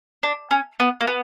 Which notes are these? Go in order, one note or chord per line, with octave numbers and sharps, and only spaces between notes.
D4
C#4
B3
A#3
B3